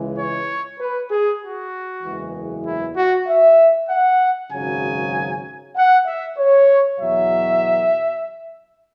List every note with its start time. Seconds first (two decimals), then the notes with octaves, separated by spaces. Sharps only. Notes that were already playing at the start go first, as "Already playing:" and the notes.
Already playing: C#2 C#3 E3 G#3
0.18 C#5
0.79 B4
1.10 G#4
1.42 F#4
2.03 F#1 E2 E3 G#3
2.65 E4
2.96 F#4
3.27 E5
3.89 F#5
4.51 G#1 F#2 C#3 F#3 G#5
5.75 F#5
6.06 E5
6.37 C#5
6.99 E2 B2 F#3 E5